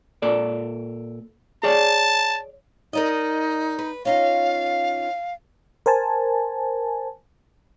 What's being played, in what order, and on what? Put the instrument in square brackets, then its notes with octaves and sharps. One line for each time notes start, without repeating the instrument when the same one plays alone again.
[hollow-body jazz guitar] A#2 A4 D5
[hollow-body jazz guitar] G#4 C#5 D5 [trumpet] A5
[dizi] D#4 [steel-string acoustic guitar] A#4 D5 D#5
[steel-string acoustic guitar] B4
[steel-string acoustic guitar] C#4 D#4 F4 [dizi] F5
[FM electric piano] A#4 C5 G#5 A5